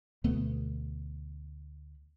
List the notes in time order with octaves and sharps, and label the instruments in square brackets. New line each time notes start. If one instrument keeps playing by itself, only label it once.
[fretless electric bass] D2 B2 A3 B3